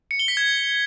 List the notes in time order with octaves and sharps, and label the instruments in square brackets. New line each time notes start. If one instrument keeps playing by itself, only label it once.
[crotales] C#7
G7
B6
G#6